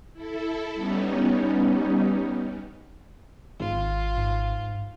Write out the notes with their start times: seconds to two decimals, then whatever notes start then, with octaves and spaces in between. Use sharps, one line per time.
0.13 E4 A4
0.74 G3 B3 C#4 D#4
3.60 G#1 F4
4.17 G#2